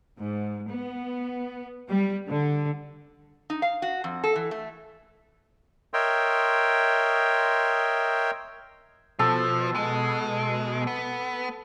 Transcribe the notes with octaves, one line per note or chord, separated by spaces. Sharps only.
G#2
B3
G3
D3
D#4
F5
F#4
F2
A4
E3
A3
A#4 C#5 D#5 E5 G5 C6
B2 F3 A4
G#3
B3